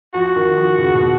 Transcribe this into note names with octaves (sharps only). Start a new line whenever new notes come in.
F3 F#4
D#3
F3
C#3
B2